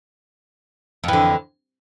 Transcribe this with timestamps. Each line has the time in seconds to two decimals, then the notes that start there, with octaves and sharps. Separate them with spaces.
1.04 F2
1.08 E3
1.13 D3